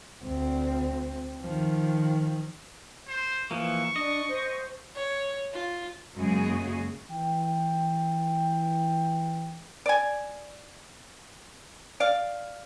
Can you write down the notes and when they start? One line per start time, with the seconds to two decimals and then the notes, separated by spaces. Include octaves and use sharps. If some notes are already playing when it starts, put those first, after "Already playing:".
0.24 D2 C4
1.41 D#3 F3
3.08 C5
3.51 E3 F3 A#3 C#6
3.96 D4 D#5
4.28 C5
4.95 C#5
5.53 F4
6.15 F#2 C#3 G#3 A#3 F#4 G#4
7.10 E3 G5
9.86 D5 G#5
12.00 D5 F5